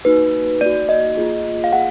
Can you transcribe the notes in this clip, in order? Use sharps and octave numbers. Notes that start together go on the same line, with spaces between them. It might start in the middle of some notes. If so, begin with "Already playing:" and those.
A#3 D#4 F#4 B4
A#3 D#4 F#4 D5
D#5
A#3 F4 G#4
F5
A#3 F4 G#4 F#5